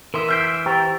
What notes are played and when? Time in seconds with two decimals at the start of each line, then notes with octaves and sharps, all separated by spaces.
0.14 E3 A#4 E5 C6 D#6
0.28 E6 F6 G6 B6 C7 D7
0.66 G4 C5 G5 A#5 C#6 A6